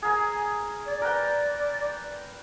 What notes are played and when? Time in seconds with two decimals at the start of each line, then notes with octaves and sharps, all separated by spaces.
0.02 G#4 A#4 G#5
0.87 D5
1.02 A#4 B4 G5